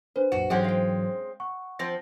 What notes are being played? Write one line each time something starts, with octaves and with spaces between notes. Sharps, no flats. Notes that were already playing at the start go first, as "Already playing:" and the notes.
D4 B4 C5
B1 F#2 A#2 F#4
G#2 E3 F#3 G#3 C4 C#4 G4 F#5
F5 G5
F#5 C#6
F3 C4 C5 A#6